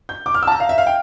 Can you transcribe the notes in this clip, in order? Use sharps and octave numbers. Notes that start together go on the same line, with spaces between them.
G6
D6
F6
E6
A5
A#5
F5
E5
F5
G5